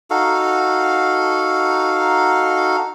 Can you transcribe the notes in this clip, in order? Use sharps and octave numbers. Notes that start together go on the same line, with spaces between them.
D#4 F#4 A4 F5